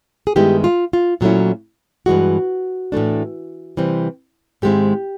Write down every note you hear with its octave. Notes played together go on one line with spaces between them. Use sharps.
G#4
G2 D#3 G#3 B3 E4 G4
F4
F4
A#2 F#3 A3 C#4 E4
G2 E3 G#3 F#4
A2 E3 A3 D4
C3 E3 G3 C4
G#2 D#3 G#3 C4 E4 G4